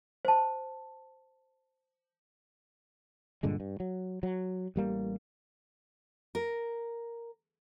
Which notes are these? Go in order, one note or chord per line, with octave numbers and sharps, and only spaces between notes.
C5 A5
G2 A#2 D3 G#3
G2
F#3
F#3
A1 G3 A#3
A#4